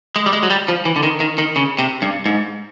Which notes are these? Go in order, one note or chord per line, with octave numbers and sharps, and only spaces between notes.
G#3
G3
G#3
F#3
G3
F3
E3
D3
D#3
D#3
D#3
C#3
C3
G2
G#2